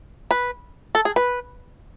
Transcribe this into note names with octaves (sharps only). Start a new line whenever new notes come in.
B4
A4
G#4
B4